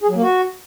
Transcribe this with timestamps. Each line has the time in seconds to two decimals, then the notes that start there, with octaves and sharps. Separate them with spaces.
0.01 G#4
0.08 F#3
0.15 A#3
0.22 F#4